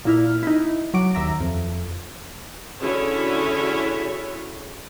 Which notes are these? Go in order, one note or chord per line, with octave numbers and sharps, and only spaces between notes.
A#2 E4 F6
D#4 E4
F#3 F#4 D6 D7
D#2 E5 A#5
F2
D3 C#4 E4 F#4 G#4 C#5